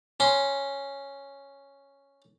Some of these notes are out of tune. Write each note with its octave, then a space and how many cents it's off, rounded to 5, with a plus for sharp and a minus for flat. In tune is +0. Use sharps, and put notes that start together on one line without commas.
C#4 +0 C6 +0